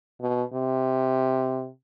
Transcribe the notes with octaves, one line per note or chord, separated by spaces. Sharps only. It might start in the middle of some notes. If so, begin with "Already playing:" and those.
B2
C3